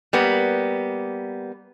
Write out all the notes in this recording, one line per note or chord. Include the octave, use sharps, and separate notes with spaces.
G3 A#3 B3